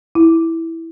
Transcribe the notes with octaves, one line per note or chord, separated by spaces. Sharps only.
E4